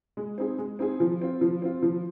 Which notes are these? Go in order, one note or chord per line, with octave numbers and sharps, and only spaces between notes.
G#3
C4 D#4 G#4
G#3
C4 D#4 G#4
F3
C4 F4
F3
C4 F4
F3